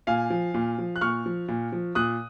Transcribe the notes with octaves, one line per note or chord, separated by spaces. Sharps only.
A#2 F5 G#5
F3
A#2
F3
F#6
A#2 C#6 F6
F3
A#2
F3
A#2 D#6 F#6